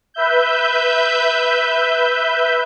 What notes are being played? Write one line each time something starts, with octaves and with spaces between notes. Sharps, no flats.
B4 E5 G6